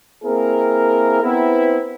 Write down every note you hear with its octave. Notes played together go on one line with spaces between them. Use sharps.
A#3 C4 E4 G#4 A#4
B3 C4 E4